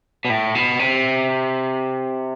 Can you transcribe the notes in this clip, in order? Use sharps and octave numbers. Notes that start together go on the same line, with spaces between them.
B2
A2
B2
C3